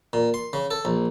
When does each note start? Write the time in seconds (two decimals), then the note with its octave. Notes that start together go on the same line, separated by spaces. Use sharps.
0.13 A#2
0.34 C6
0.53 C#3
0.71 A4
0.85 A#1